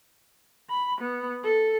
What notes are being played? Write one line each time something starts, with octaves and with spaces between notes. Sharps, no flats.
B5
B3
A4